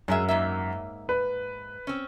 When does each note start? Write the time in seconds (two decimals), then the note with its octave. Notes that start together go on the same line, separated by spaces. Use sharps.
0.08 F#2 G#3 G#4 E5
0.29 G#2 A#3 E5
1.09 B4
1.87 C4 C#4